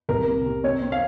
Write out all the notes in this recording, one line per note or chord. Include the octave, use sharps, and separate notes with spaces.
C2 A#4
C3
C3
C4 C#5
C4
F5